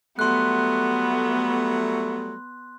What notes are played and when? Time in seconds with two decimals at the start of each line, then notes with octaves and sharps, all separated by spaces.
0.19 F#3 G3 A3 B3 C6 F#6